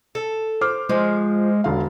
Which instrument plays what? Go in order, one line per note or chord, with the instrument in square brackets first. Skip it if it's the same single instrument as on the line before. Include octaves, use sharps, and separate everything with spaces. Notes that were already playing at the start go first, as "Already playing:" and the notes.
[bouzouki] A4
[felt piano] C5 D6 F6
[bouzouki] F3 [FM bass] G#3
[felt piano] E1 D3 F5